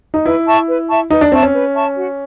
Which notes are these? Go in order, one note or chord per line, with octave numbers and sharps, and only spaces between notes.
D#4
E4 B4
E5 A5 C#6
B4
E5 A5 C#6
D#4 B4
D4
C4 E5 A5 C#6
C#4
B4
E5 A5 C#6
F#4